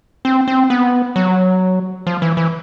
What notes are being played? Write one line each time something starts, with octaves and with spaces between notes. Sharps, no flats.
C4
C4
B3
F#3
F3
E3
E3